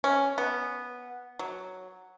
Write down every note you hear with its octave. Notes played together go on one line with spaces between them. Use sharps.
C#4
B3
F#3